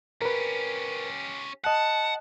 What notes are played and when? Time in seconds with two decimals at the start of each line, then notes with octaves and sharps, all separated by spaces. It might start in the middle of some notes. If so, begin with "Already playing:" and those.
0.22 C#4 G4 A#4 B4
1.64 D#5 F#5 A5 F#6